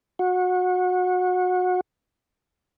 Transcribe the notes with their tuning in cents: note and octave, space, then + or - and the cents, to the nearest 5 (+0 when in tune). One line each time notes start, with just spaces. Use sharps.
F#4 -25